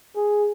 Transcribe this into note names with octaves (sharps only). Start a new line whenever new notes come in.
G#4